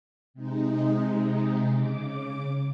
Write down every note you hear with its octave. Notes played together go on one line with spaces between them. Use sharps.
C3 G#3 D#4
C#3 D6